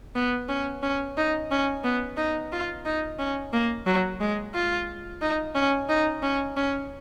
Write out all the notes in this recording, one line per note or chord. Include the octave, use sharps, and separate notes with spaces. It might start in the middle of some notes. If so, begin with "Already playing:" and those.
B3
C#4
C#4
D#4
C#4
B3
D#4
F4
D#4
C#4
A#3
F#3
G#3
F4
D#4
C#4
D#4
C#4
C#4